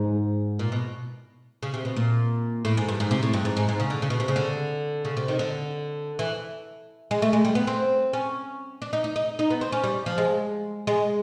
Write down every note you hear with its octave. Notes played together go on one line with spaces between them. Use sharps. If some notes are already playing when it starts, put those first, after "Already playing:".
Already playing: G#2
A#2
B2
C#3
C3
B2
A#2
A2
G#2
G2
G#2
C3
A2
G2
G#2
G#2
G#2
C#3
D3
C#3
B2
C3
C#3
D3
C#3
C3
D#3
D3
E3
G#3
A3
G#3
G3
B3
C4
C#4
D4
D#4
D#4
D#4
D#4
B3
C4
C#4
G3
F3
G#3
G#3